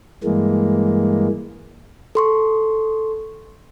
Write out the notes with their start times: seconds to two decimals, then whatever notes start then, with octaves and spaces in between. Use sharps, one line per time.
0.24 G2 E3 G#3 A#3
2.15 A4 C6 C#6